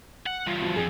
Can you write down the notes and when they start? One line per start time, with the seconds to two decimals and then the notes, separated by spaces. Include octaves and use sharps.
0.26 F#5
0.47 E2 G2 F4
0.60 B2 F3
0.76 F2 G#4